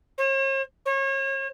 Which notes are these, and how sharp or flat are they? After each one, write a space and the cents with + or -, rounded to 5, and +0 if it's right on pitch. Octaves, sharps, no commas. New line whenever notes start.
C#5 -45
C#5 -35